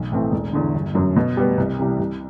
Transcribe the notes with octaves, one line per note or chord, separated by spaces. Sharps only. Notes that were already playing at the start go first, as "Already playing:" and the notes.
Already playing: B1
A2 E3 A3 C4
E1
E2 D3
G1
F#2 F#3
B2
G3 B3
C2
C3 E3 G3
C2